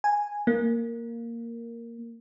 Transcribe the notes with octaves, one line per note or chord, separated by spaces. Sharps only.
G#5
A#3